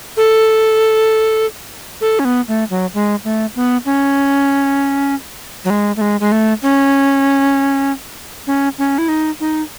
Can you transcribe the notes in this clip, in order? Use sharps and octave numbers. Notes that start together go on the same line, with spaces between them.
A4
A4
C#4
B3
A3
F#3
G#3
A3
B3
C#4
F#3
G#3
A3
G#3
G#3
A3
C#4
C#4
C#4
E4
D#4
D#4